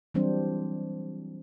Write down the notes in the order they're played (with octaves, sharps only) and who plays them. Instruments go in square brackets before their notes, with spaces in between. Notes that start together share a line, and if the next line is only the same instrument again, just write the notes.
[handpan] E3 F#3 G3 C4 D4 C5